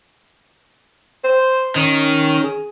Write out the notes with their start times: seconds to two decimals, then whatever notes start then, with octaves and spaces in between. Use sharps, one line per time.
1.24 C5
1.76 D#3 C#4
2.42 G#4